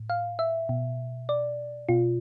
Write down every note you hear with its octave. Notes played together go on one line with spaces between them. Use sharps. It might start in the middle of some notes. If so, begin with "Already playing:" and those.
Already playing: A2
F5
E5
B2
D5
B2 F4